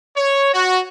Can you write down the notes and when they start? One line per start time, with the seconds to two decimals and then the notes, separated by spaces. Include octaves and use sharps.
0.16 C#5
0.53 F#4